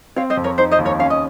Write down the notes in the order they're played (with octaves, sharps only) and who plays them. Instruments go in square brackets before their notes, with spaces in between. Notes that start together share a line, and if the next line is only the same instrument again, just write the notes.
[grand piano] C4 [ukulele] C#5 F5
[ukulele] C5 D#5
[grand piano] F2
[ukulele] A#4 C#5
[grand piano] D#4 [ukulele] C5
[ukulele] C5 D#5
[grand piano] D#2
[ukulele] A#4 C#5
[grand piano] C#4 [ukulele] F5
[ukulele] D#5